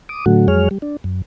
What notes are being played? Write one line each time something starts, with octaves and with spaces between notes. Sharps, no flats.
D6 D#6
A2 D3 F#3 A3 F#4
F2 F#3 G#3 G#4 C#5 F6
G3
D4
F#2